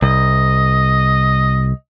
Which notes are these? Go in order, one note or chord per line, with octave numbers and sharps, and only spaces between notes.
C2 D#5